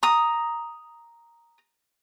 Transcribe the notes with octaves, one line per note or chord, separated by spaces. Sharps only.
A#5 D#6